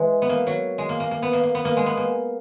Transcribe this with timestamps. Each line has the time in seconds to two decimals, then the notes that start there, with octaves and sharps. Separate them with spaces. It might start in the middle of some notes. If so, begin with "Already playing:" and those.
Already playing: E3 G#3
0.22 B3
0.29 A#3
0.47 F#3
0.78 G#3
0.89 A#3
1.00 A#3
1.11 A#3
1.22 B3
1.33 A#3
1.43 A#3
1.55 B3
1.65 A#3
1.77 G#3
1.86 B3
1.97 A#3